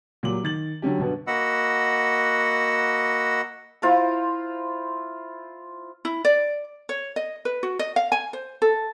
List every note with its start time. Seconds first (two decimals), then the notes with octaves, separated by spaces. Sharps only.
0.23 A#2 F#3 G3 D6 F#7
0.44 D#3 A6 F#7
0.82 D3 F#3 C#4 G4
0.99 G2 B2 B3
1.27 A#3 F#4 D#5 F#5 B5 E6
3.82 E4 F4 C5 A#5
6.05 E4
6.25 D5
6.89 C#5
7.16 D#5
7.45 B4
7.63 F#4
7.79 D#5
7.96 F5
8.12 G#5
8.33 C5
8.62 A4